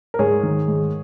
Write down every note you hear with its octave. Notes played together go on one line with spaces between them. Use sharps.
A#4
G#2 G#4 C#5
D#3
G#2